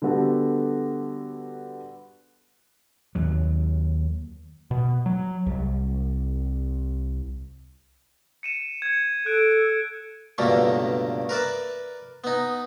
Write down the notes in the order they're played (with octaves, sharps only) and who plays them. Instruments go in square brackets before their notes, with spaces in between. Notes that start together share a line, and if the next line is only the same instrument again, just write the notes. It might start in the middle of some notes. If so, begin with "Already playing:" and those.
[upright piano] D3 G3 B3 F#4 G4 A4
[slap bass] D#2 F#3
[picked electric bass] B2
F#3
C2
[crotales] C#7 D#7 E7
G#6 C#7
[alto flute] A4 [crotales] F#6 G6 D7
[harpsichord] C#2 G2 B2 D3 A3 A#3
A#4 B4 D5 E5
B3 D#4